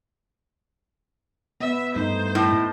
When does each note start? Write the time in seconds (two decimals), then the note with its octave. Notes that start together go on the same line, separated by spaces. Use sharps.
1.60 B3 E5
1.96 G2 A3 D#4 C5
2.35 A2